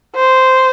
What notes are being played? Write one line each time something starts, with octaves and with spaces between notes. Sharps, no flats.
C5